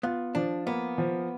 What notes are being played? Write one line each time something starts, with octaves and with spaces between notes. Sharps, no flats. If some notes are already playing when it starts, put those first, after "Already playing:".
B3 F4
F3 D4
A#3 B3
F3